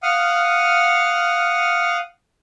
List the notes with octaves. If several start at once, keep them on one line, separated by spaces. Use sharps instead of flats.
F5 F#5 D#6 F6